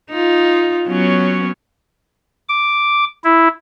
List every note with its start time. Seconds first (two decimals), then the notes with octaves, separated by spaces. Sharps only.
0.10 D#4 F4
0.87 F#3 B3 C#4
2.49 D6
3.24 E4